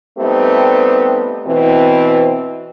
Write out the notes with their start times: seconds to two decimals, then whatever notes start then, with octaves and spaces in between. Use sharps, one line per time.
0.19 G3 A3 B3 C4 D#4 G4
1.46 B2 E3 C4